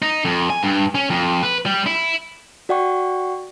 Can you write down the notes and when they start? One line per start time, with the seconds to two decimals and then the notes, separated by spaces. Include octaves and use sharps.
0.02 D#4
0.25 F2
0.50 G#5
0.63 G2
0.95 C#4
1.10 F2
1.43 B4
1.66 G3
1.86 E4
2.69 F#4 D5 F#5 G5 C#6